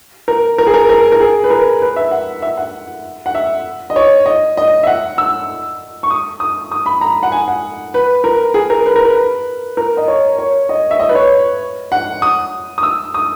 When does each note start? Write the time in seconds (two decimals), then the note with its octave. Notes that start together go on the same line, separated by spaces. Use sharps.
0.28 A#4
0.58 A#4
0.67 G#4
0.74 A#4
0.89 A#4
1.12 A#4
1.20 G#4
1.44 B4
1.50 A#4
1.82 B4
1.96 E5
2.11 F#5
2.42 E5
2.57 F#5
3.26 F#5
3.35 E5
3.90 D#5
3.96 C#5
4.26 D#5
4.57 D#5
4.83 E5
4.87 F#5
5.18 E6
6.03 C#6
6.10 D#6
6.40 D#6
6.72 D#6
6.86 B5
7.01 A#5
7.23 F#5
7.32 G#5
7.48 F#5
7.94 B4
8.24 A#4
8.54 G#4
8.70 A#4
8.86 B4
8.96 A#4
9.05 B4
9.77 A#4
9.97 D#5
10.08 C#5
10.39 C#5
10.69 D#5
10.91 E5
10.99 D#5
11.09 B4
11.15 C#5
11.92 F#5
12.22 D#6
12.78 D#6
12.83 E6
13.14 D#6